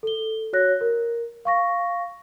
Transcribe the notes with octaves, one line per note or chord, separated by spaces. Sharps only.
A4 G7
F#4 C#5 F#6 A#6
A#4
F5 C#6 A#6